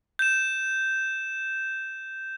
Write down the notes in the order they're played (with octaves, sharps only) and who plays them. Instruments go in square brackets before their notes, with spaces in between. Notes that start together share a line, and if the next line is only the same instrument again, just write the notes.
[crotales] G6 E7